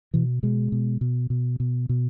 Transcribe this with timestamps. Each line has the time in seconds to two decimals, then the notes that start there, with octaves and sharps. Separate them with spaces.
0.14 B2 E3
0.43 B2 G#3
0.72 B2
1.01 B2
1.30 B2
1.60 B2
1.89 B2